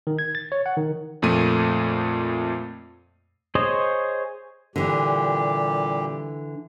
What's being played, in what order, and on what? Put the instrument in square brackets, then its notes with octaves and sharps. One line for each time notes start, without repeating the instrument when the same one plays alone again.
[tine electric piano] D#3
G#6
A6
C#5
F#5
D#3
[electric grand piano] F2 A#2 A3 D#7
[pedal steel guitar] G#4 C5 C#5 D#5
[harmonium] A#2 G3 G4 [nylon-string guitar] D3 E3